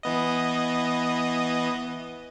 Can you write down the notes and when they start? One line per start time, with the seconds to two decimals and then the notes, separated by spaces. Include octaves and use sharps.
0.03 E3 B3 D#5